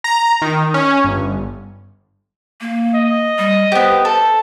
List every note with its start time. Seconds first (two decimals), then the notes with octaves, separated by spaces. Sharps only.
0.04 A#5
0.42 D#3
0.74 C#4
1.04 G1
2.61 A#3
2.95 D#5
3.38 G3
3.72 B3 G4 C5
4.05 A4